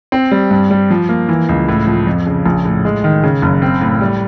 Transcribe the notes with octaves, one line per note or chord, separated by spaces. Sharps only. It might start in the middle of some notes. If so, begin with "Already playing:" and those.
C4
G3
G2
G3
F3
A#3
E3
C#2
A2
F3
F2
C#3
A#1
A2
G#3
D#3
C#3
F#1
C4
A2
G3